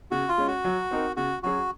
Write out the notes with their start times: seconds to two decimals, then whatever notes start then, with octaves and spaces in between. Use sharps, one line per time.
0.11 C#3 F#4
0.29 F4
0.38 G#3 C#4
0.47 F#4
0.64 F#3
0.91 C4 D#4 A#4
1.16 C#3 F#4
1.43 F#3 C#4 F#4 G#4